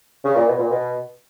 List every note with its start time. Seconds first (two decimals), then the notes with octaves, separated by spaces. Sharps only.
0.23 C#3
0.35 A#2
0.47 B2
0.58 A#2
0.70 B2